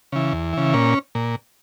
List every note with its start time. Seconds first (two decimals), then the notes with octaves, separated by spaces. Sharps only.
0.12 C#3 E3
0.33 E2
0.53 C#3 E3
0.74 A#2 C#4
1.15 A#2